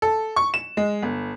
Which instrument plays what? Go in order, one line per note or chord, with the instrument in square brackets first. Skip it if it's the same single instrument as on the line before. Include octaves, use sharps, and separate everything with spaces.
[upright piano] A4
C#6
E7
G#3
G1